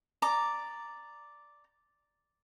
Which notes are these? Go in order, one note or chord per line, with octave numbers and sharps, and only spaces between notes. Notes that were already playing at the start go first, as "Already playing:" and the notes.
D5 A#5 D6